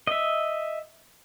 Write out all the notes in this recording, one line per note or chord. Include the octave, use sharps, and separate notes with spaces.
D#5 E5